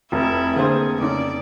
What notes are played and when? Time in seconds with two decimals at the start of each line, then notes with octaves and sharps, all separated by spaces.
0.12 F1 E4
0.56 D3 A#3 G#4 C5
1.01 C#3 C#4 D#4 D5